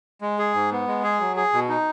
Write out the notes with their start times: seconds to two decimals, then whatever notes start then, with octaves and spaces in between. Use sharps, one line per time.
0.21 G#3
0.39 G#4
0.54 G#2
0.71 B3
0.87 G#3
1.04 G#4
1.20 F#3
1.36 G#4
1.53 B2
1.69 D#4